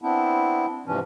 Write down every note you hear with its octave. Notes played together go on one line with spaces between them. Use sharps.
B3 C4 D4 E4
G#2 C3 E3 F3 C#4 D4